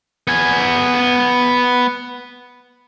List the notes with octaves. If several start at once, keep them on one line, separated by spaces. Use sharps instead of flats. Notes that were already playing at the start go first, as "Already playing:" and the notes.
B3 G#5